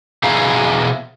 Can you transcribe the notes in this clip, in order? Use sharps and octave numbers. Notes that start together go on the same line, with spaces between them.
B2 E4 G#4 F5 A#5